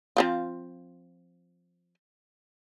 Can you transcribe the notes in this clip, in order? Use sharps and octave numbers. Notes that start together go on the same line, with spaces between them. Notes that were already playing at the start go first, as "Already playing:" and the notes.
F3 C4 F4